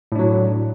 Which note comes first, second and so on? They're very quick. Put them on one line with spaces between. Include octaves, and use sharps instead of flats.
A2 D4 F#3